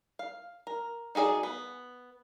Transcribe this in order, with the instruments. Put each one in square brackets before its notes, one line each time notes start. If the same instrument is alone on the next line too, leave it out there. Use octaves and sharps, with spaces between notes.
[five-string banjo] F5
A#4
D#4 F#4 G#4 A#4 D5
B3